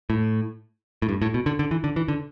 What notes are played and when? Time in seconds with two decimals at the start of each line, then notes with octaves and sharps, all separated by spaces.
0.10 A2
1.02 A2
1.09 G2
1.22 A2
1.34 B2
1.46 D3
1.59 D3
1.71 E3
1.84 D3
1.96 E3
2.08 D3